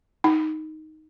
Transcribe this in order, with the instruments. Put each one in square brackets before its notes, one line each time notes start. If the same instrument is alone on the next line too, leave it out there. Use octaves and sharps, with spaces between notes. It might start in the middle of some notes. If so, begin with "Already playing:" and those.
[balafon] D#4